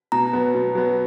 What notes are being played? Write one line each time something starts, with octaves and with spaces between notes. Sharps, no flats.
B2 A#5
F#3 B3
B2
F#3 B3